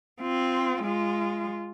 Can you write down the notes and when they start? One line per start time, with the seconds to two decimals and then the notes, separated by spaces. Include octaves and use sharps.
0.21 C4 F4
0.84 G#3 F4